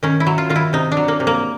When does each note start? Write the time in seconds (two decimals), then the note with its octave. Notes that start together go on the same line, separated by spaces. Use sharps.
0.03 D#3 C#4
0.20 E4
0.27 F#3
0.38 F4
0.50 D#3 F4
0.56 E4
0.73 C3 D#4
0.92 D4
0.97 F#3
1.08 A#3
1.20 C3
1.27 A#3